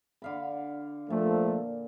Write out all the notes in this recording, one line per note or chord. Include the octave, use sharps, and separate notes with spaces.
D3 F5 B5
A#2 F3 A3 A4